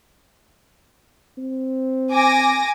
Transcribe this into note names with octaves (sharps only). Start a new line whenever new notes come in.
C4
G#5 D6 A#6